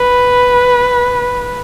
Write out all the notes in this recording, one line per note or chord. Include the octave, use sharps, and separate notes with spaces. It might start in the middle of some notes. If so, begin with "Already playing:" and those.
Already playing: B4